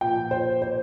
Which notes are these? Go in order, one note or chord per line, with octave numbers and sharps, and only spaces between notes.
A#2 F3 G5
C5
C5